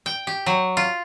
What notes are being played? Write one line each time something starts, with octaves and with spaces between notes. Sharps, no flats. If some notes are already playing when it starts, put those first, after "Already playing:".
G5
G4
F#3
F4